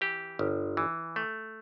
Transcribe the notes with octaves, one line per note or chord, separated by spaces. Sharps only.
E3 G4
G1
E3
A3